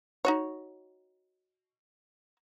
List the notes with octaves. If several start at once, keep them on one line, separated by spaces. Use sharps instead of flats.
D#4 F#4 C#5